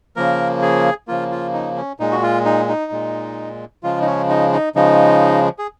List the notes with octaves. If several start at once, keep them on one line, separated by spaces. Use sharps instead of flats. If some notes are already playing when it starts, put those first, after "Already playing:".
C#3 F3 A#3 A#4
G#4
C#3 F3 A#3 F4
F4
D#4
C#4
A#2 G#3 D#4
F#4
F4
D#4
D#4
A#2 G#3
C#3 F3 G#3 F4
D#4
C#4
D#4
D#4
C#3 F3 G#3 D#4
G#4